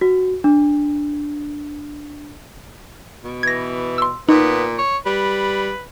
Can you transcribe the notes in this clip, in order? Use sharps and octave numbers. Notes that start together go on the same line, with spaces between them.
F#4
D4
B2
E3 G#6 A#6
C6 E6
A#2 B3 D#4
C#5
G3 B4